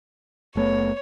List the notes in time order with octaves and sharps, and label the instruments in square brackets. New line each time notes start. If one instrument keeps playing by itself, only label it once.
[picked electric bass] F#1 A3 B3 [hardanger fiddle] C#5